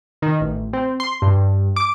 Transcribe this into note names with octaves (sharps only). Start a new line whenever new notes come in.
D#3
A1
C4
C6
G2
D6